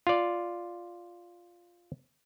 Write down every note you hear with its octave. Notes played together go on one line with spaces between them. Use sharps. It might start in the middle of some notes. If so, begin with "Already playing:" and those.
F4 D5